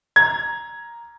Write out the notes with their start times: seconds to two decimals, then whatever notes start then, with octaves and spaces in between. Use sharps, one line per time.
0.16 A#5 G#6